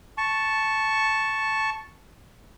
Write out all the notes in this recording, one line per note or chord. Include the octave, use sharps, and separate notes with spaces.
A5 C#6